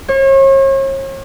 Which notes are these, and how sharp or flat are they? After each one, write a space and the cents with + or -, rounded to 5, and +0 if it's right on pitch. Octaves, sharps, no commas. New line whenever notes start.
C#5 -40